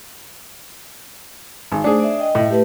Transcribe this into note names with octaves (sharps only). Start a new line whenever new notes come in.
G#1
A3 D4 G#4 C5
D5 E5
D#5 G5
A2
A3 G4 B4